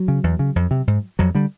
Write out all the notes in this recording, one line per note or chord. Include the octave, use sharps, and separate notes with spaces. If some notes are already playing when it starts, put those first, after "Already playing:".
Already playing: F#3
C#3
E2
C#3
F2
C3
G#2
F2 F#3
D3 G3